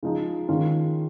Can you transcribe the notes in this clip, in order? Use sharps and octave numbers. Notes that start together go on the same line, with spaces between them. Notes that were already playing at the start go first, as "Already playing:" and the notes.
C#3 F3 G#3 D#4
D#3 G#3 C#4 F4